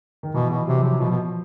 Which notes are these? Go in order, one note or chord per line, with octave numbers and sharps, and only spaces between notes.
D#3
B2 E3
B2 F#3
C3 F#3
F3
C3 F#3
B2 F3
B2